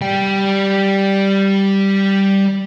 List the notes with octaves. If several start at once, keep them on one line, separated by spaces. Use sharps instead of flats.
G3 G5